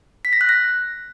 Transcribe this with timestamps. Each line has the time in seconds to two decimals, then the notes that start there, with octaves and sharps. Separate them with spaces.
0.25 B6
0.33 A#6
0.41 F#6
0.49 A#6